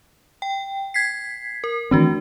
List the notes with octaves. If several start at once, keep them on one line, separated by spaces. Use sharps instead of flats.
G5
G#6 B6 C7
A#4
D#3 E3 A3 C4 D4 F#4